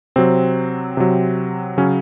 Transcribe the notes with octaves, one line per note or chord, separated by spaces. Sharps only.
C3 F#3 C4
C3 F#3
C#3 F#3 C#4